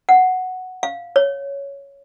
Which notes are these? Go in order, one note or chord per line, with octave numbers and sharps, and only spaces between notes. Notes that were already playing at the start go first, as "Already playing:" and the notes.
F#5
F5
C#5